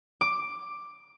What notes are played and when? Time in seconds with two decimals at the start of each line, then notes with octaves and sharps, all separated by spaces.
0.21 D6